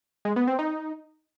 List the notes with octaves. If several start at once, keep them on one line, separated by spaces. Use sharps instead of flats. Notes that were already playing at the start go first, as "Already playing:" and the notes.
G#3
B3
C4
D#4